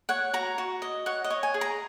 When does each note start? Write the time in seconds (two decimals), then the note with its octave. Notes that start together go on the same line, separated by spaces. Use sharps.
0.09 C#5 F#5
0.33 F#4 A#5
0.58 F#4
0.82 D#5
1.06 C#5 F#5
1.24 D#5
1.30 C#5
1.43 G#5
1.54 G#4
1.61 A#5